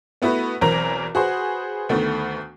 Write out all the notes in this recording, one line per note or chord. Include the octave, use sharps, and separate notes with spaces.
A3 B3 E4 F#4 B4
B1 E2 E3 C4 A#4 A#5
F#4 G#4 B4 C5
D2 D#3 A3 B3